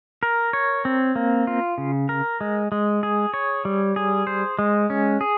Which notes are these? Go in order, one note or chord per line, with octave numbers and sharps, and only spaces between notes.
A#4
C#5
C4
A#3
F4
C#3
A#4
G#3
G#3
G#4
C#5
G3
G#4
C5
G#3
C#4
G#4